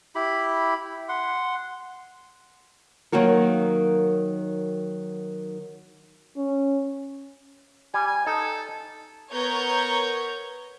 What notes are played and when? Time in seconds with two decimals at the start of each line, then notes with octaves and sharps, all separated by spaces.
0.15 E4 G4 B5
1.09 F#5 C6
3.12 D#3 F#3 A#3 F#4 A#4
6.36 C#4
7.94 G3 G#5
8.07 G#5
8.26 D#4 A4
9.32 B3 A#4 C#5 A#5 G6 G#6